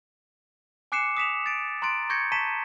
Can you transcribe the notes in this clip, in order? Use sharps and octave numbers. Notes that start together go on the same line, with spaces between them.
G#5 D6 F#6 C7 C#7 E7
D#6 B6 E7 F7
A6 D7
A#5 C6 F#6 A6 D7
C#6 G6 G#6 A#6 C#7
A5 A#5 C#6 B6 D#7 E7